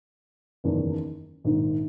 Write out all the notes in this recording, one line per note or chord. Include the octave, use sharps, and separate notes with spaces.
F#1 E2 D#3
A#1 G#2 D#3